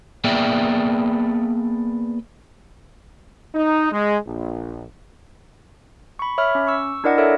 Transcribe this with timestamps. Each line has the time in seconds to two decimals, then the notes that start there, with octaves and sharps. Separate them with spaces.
0.24 A#3 B3 G#4 D5 E5 G5
3.54 D#4
3.91 G#3
4.26 A#1
6.19 B5 C#6
6.38 C#5 E5 B5 F6
6.55 C#4
6.67 C#6 E6
7.04 D4 E4 A#4 D5 D#5 F#5
7.18 A4 A#4 C#5 D5 E5 F#5